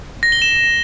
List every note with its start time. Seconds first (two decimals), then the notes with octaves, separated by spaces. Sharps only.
0.23 A#6
0.32 G7
0.42 E7